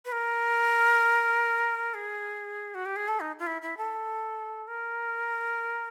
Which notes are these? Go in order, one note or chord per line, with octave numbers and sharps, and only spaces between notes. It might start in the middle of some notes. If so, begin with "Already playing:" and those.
B4
A#4
G#4
F#4
G4
G#4
A4
D#4
F4
E4
E4
A4
A#4